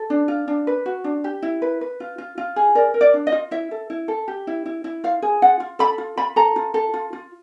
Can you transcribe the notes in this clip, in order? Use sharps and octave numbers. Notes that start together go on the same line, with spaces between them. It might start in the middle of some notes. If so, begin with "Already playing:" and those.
Already playing: A4
D4
F4
D4
B4
F#4
D4
G4
E4
B4
B4
F4
F4
F4
G#4
A#4 D5
A#4
D5
D4
D#5
F4
E4 E5
A4
E4
A4
G4
E4
E4
E4
F4 F5
G#4
F4 F#5
F4
A4 B5
F4
F4 B5
A4 A#5
F4
A4
F4
F4